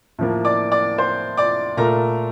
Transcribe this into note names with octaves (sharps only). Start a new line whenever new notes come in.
A2 F3 A#3
D5 D6
D5 D6
C5 C6
D5 D6
A#2 A3 A#4 A#5